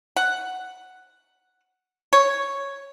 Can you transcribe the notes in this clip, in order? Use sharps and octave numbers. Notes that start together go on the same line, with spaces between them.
F#5
C#5